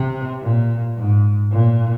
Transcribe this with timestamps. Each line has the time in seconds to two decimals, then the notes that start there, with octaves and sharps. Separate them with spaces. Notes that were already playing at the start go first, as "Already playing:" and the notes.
Already playing: C3
0.42 A#2
0.97 G#2
1.51 A#2